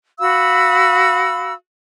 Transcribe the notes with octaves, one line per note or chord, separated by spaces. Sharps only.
F#4 F5 B5 E6